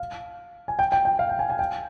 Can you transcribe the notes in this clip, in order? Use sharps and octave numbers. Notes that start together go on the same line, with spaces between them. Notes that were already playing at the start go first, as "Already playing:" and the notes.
Already playing: F5
G#5
G5
G5
G5
F5
G5
G#5
G#5
G5